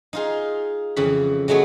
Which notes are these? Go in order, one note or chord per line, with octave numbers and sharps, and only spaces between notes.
D#4 F4 G#4
F2 C#3 E3 B5
F#3 G#3 A3 B3 G#4